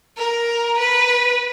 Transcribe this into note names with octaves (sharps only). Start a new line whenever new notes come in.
A#4
B4